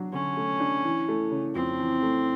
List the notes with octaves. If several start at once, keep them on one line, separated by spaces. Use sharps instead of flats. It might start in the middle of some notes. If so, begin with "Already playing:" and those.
Already playing: F#3 D4
D3 C#4
A3
D4
E3
A3
C#3
F2 C4
E3
A3